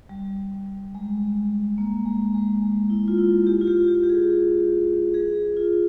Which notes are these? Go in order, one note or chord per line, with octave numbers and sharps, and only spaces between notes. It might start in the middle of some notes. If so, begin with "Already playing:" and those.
G3
G#3
A#3
G#3
G#3
G#3
E4
F4
E4
G4
F4
G4
G4
G4
G#4
G#4
F4